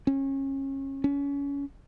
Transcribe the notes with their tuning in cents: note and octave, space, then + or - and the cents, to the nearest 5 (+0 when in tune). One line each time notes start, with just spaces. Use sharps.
C#4 -30
C#4 +25